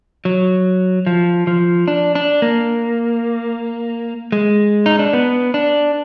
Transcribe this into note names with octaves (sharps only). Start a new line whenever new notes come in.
F#3
F3
F3
D4
D4
A#3
G#3
D#4
D4
B3
D4